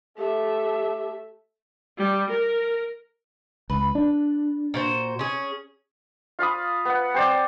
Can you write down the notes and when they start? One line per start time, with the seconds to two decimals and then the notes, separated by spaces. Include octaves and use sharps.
0.18 A3 G4 E5
1.98 G3
2.30 A#4
3.70 C#2 B4
3.95 D4
4.74 A#2 F#4 C5
5.19 C#4 G#4
6.39 F4 F5 B5 D#6
6.85 B3 F#5
7.14 C4 C5 D5